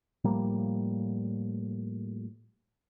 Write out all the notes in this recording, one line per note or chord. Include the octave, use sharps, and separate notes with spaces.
A2 F3 G3 A#3